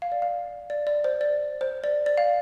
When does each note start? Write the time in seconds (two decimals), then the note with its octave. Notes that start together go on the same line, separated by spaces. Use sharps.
0.02 F5
0.12 D5
0.22 F5
0.70 D5
0.87 D5
1.04 C5
1.21 D5
1.61 C5
1.84 D5
2.06 D5
2.18 F5